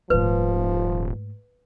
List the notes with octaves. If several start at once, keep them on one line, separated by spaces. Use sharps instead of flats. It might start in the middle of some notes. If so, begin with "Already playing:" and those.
D#1 G#2 F3 A3 B4